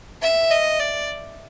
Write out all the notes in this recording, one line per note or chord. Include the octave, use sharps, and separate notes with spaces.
E5
D#5
D5